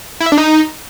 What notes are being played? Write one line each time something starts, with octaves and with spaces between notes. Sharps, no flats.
E4
E5
D4
D#4